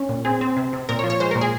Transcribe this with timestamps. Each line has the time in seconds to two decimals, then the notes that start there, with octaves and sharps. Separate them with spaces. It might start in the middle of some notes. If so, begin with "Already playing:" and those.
Already playing: C#4
0.09 A#2
0.25 C4 G#4
0.41 C4
0.57 C3
0.73 C3
0.89 A#2 A#4
0.99 C#5
1.04 F3
1.10 C#5
1.20 G#3 C5
1.31 A#4
1.35 A#2
1.41 G#4